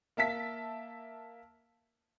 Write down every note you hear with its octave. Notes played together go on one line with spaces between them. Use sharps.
A#3 E5 A5 B6